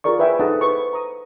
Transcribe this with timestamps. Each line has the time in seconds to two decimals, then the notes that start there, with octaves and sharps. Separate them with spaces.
0.04 F4 G#4 A#4 D5 C#6
0.19 B4 C5 E5 G5 G#5
0.39 D#4 G#4 A4 D#5 F#5 A5
0.61 B4 C5 C#6
0.93 A#5 D#6